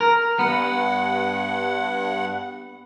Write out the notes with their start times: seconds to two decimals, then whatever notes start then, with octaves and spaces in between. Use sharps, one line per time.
0.01 A#4
0.39 G2 B3 F#5